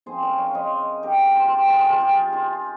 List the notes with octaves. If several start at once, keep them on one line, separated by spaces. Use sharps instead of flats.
C#3 F3 C4 G#4 C5
A#4 C#5
C#5 F5
C5 D#5
G4 A#4
F4
F4
G4
F4 G#4
F4 G#4
G4
F4 G#4